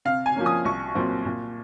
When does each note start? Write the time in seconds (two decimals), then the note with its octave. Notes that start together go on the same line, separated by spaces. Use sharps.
0.05 C3 F5
0.26 G#5
0.35 F3 A#3 C#4
0.46 D#6
0.65 C2 C#6
0.95 A#2 F#3 C4
1.25 A#2